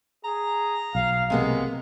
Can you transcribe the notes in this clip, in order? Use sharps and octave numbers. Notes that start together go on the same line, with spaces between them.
G#4 A#5
B1 F5
C3 G#3 A#3 B3